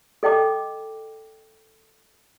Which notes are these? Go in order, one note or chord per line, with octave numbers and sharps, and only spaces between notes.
A4 D#5 G5 A5 D6